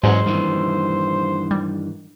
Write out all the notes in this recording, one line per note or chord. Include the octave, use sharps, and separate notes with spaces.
E2 G#2 F#3 G#3 C#4 C5
G2 D#3 E3
G3